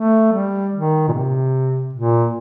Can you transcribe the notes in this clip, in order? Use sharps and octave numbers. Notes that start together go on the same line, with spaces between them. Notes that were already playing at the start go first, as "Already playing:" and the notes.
Already playing: A3
G3
D#3
A#2
C3
A#2